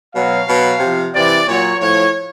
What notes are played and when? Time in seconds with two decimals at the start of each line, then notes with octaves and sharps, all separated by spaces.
0.14 B2 F#3 F5
0.47 B2 F#3
0.80 C3 F3
1.14 C3 E3 D5
1.47 A#2 F#3 C#5
1.79 A2 F3 C#5